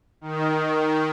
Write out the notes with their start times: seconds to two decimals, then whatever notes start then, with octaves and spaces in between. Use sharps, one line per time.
0.21 D#3